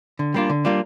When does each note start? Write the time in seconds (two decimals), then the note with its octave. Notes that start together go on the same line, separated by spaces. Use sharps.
0.19 D3
0.34 G3 A#3 D4 F4
0.50 D3
0.65 G3 A#3 D4 F4